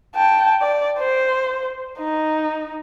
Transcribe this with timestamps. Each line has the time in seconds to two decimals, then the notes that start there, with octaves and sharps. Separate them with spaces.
0.15 G5 A5
0.61 D5
0.98 C5
1.98 D#4